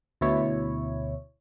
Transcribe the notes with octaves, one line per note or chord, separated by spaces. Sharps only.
D2 B2 E4 C#5